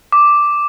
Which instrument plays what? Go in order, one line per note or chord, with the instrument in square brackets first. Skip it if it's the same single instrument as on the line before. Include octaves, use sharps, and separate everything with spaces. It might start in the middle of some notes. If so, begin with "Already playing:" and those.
[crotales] D6